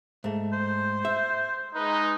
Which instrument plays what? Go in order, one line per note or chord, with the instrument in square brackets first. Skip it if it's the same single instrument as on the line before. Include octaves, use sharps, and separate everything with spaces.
[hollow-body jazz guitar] G#2 A3
[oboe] C5
[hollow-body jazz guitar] E5
[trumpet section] G#3 D#4 [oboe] B4